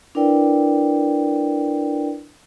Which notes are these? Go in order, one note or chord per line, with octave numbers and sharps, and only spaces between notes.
D4 E4 A#4 B4 D5 G5